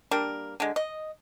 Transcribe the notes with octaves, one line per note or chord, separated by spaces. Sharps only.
G3 A#3 D4 A#4
D3 G#3
D#5